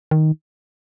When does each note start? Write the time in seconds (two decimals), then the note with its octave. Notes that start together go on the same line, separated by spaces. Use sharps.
0.11 D#3